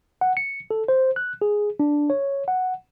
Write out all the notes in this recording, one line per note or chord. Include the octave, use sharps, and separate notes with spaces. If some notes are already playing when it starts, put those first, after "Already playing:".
F#5
C#7
A4
C5
F#6
G#4
D4
C#5
F#5